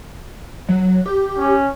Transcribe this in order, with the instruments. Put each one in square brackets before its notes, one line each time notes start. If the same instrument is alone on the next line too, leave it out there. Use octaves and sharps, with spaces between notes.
[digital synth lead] F#3
G4
[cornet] C#4